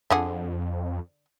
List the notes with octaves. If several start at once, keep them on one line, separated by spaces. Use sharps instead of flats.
F2 D3 G#4 F#5